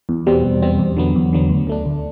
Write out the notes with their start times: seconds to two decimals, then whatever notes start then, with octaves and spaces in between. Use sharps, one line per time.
0.09 E2
0.27 B2 G3 C4
0.44 E2
0.62 B2 G3 C4
0.79 E2
0.97 D3 F#3 B3
1.15 E2
1.33 D3 F#3 B3
1.49 D2
1.67 D3 A3 D4
1.86 D2